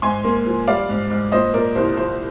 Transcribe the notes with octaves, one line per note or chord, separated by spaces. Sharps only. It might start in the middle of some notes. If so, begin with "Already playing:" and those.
G#2 G#5 C6
A#3
F3
G3 D5 F5
G#2
G#2
A#2 C5 D#5
A#2 A#4 D5
C2 C5
F3 C5